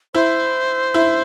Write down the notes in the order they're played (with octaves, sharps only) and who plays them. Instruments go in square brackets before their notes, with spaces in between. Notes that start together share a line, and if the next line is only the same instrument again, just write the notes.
[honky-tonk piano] E4 [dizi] C5
[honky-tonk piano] E4